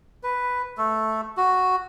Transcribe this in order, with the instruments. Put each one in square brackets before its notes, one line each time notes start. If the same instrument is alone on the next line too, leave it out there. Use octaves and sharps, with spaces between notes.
[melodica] B4
A3 A4
F#4